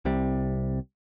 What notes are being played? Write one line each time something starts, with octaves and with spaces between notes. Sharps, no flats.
C2 C3 G3